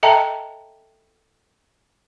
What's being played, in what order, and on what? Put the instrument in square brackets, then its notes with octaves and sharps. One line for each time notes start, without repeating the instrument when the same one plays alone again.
[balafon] A4 D#5 E5 G5 A5 A#5